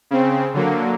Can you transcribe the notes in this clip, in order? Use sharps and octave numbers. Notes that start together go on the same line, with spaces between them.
C#3 C4
D3 F#3 A#3